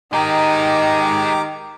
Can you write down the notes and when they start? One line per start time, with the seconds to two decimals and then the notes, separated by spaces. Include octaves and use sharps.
0.13 D#3 G#3 D#4 G4 A#5 D6